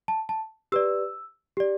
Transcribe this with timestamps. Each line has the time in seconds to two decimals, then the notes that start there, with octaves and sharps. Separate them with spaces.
0.08 A5
0.29 A5
0.72 G4 B4 D5 E6
1.57 G4 D5